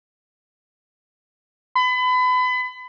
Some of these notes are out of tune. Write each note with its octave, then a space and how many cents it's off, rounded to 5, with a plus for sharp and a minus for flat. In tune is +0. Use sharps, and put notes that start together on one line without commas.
B5 +30